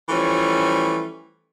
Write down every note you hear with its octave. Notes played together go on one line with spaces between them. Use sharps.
E3 F3 G3 A3 C#4